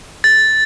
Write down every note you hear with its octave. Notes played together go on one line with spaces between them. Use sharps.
A6